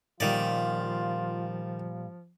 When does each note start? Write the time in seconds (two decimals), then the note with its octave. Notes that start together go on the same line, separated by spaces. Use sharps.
0.20 A#2 D#3 F3 G3 A#3 F4 D5